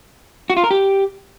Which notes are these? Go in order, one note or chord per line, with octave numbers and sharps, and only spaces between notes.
F#4
F4
A#4
G4